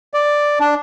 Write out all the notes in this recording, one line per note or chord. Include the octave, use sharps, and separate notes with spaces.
D5
D4